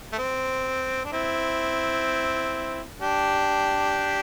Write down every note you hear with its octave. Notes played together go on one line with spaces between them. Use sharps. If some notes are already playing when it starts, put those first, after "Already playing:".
A3
C4
D4
C4 E4
D4 G4